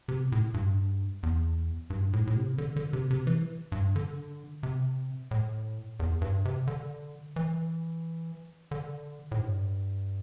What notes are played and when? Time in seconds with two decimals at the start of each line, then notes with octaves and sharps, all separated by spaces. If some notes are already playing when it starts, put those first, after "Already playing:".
0.08 C3
0.32 A2
0.54 G2
1.23 E2
1.90 G2
2.13 A2
2.27 A2
2.36 C3
2.58 D3
2.76 D3
2.93 C3
3.11 C3
3.27 E3
3.72 G2
3.96 D3
4.63 C3
5.31 A2
6.00 E2
6.22 G2
6.45 C3
6.67 D3
7.36 E3
8.71 D3
9.32 A2
9.40 G2